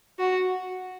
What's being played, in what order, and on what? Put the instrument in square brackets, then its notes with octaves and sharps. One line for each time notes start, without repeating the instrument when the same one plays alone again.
[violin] F#4